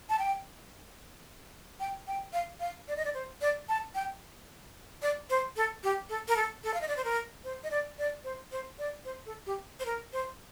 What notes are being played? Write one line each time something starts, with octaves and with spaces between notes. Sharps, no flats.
A5
G5
G5
G5
F5
F5
D5
D#5
D5
C5
D5
A5
G5
D5
C5
A4
G4
A4
A#4
A4
A4
F5
D#5
D5
C5
A#4
C5
D#5
D5
D5
C5
C5
D5
C5
A4
G4
C5
A#4
C5